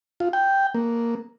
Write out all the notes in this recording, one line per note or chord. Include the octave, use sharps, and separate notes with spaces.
F4
G5
A#3